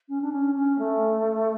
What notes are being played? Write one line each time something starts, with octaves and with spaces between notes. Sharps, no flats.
C#4
D4
C#4
C#4
A3